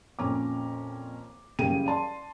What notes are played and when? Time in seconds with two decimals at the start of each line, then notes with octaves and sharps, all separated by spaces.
0.19 F2 A#2 C#4 A#5 D6
1.59 F#1 C#3 G3 G#4 G5 D#7
1.87 D5 A5 C6